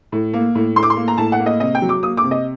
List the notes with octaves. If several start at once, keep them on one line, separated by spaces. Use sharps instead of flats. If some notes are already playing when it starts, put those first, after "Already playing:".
A2
A#3
A2
A2 C6
D6
C6
A#3
A#5
A2 A5
F#5
A#3
D#5
C3 D#5
G5
F#3
D6
A#3 D#6
D6
C3
D#5